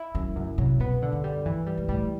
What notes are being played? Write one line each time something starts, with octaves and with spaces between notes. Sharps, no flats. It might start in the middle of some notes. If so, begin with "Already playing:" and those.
Already playing: E4
F#2 F#3
F#2 C#3
C3 F#3
B2 B3
D3
F#2
G3
G2 E3
G3
G#2
A2 G3